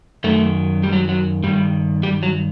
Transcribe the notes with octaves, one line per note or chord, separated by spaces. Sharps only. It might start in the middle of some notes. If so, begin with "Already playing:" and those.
F#2 D#3 A3
G3
F#3
F#3
G2 D#3 G3
G3
F#3